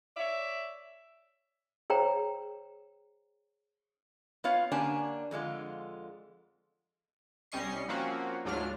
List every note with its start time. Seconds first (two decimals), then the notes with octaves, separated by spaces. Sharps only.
0.16 C#5 D5 E5
1.90 G#4 C5 C#5 G5 A#5
4.44 B3 F4 C#5 F5
4.72 D3 A#3 C#4 D4 G4 G#5
5.31 F2 D3 G#3 F4
7.52 C2 G3 C#4 D#5 C#6 C7
7.88 F3 A#3 C4 C#4 F#4
8.45 D2 G#2 F#3 D4 F4 F6